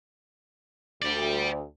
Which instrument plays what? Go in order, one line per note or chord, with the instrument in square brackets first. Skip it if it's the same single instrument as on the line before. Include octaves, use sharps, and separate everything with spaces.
[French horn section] D2 [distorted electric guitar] G4 D5